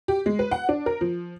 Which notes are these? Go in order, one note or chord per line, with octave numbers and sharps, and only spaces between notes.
G4
G#3
B4
F#5
D4
A#4
F3